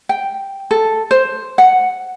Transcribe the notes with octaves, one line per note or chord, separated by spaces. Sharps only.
G5
A4
C5
F#5